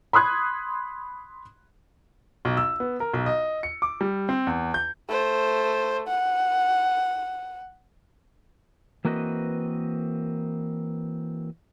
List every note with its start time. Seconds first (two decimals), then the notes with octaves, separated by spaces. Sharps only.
0.13 B5 C6 D#6 F#6 G#6
2.45 B1
2.57 E6
2.80 B3
3.00 A#4
3.13 B1
3.26 D#5
3.63 C#7
3.82 D6
4.01 G3
4.29 C4
4.47 E2
4.74 G6
5.08 A3 C5
6.08 F#5
9.05 E3 A#3 C4 F#4 B4 D#5